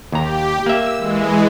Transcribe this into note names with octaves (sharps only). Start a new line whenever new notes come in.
D#2 G4 A#5
A#3 E5 E6
E3 G#3